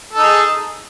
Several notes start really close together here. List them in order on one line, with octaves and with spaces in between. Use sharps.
A4 D#4 G#4